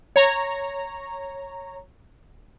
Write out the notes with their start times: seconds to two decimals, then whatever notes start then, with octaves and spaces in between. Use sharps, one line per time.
0.16 C#5 A#5